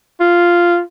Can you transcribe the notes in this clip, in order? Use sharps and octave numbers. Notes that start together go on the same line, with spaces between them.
F4